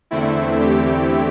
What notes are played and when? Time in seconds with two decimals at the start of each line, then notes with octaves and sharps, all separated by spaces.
0.11 E2 D3 A3 C4 E4
0.60 G4